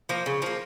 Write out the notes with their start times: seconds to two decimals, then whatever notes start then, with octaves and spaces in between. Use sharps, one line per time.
0.09 F3 A#3
0.26 C#3
0.42 F3 A#3